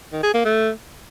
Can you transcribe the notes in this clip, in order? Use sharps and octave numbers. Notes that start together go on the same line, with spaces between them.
D#3
G#4
A#3
A3